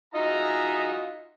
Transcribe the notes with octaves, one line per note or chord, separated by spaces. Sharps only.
D#4 F4 F#4 G#4 D#5 E5 A#5